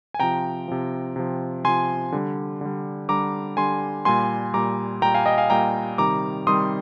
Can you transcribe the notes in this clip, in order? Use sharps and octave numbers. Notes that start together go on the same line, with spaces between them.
G#5
C3 F3 G5 A#5
C3 F3
C3 F3
C3 F3 G#5 C6
D3 G3
D3 G3
D3 G3 A#5 D6
D3 G3 G#5 C6
A#2 G3 G#5 C6
A#2 G3 A#5 D6
A#2 G3 G5 A#5
F5 G#5
D#5 G5
F5 G#5
A#2 G3 G5 A#5
C3 D#3 G3 A#5 D6
C3 D#3 G3 C6 D#6